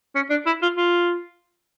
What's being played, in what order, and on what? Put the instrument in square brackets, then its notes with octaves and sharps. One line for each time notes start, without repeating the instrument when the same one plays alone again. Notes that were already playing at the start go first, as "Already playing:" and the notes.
[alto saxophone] C#4
D4
E4
F4
F4